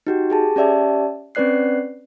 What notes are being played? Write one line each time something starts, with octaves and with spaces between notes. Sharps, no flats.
D#4 F#4 G4
G4 G#4 A5
C#4 G4 D5 E5 A5
C4 C#4 B4 D5 F#6 C7